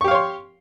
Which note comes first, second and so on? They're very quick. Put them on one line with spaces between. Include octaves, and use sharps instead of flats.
C#6 G4 F5 C#5 C6